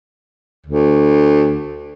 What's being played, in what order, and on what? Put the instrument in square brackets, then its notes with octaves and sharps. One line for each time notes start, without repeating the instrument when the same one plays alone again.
[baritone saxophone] D2